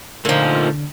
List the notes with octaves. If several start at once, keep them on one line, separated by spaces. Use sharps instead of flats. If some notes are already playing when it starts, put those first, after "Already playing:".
A#2 D3 F3 A3 D#4